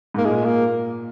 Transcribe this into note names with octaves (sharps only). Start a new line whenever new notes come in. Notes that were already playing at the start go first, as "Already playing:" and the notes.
G#2 A#3
A#2 G#3
A#3